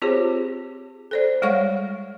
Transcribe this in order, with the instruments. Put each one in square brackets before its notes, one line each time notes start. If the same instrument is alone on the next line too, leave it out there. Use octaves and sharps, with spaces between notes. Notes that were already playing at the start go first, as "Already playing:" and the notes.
[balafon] C4 F4 G4 G#4 C5 C#5
A4 C5 D5
G3 G#3 C#5 F5 F#5 C#6